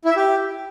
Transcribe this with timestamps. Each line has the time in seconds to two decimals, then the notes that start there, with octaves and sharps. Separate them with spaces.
0.05 E4
0.10 E5
0.16 G4